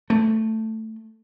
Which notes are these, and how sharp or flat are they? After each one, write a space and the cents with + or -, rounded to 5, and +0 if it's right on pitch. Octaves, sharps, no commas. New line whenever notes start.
A3 +5